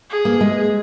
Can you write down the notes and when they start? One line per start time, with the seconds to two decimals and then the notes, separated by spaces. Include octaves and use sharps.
0.10 G#4
0.25 A#3
0.41 G#3